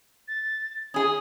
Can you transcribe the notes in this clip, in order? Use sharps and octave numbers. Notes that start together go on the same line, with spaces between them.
A6
C#4 G#4 D#6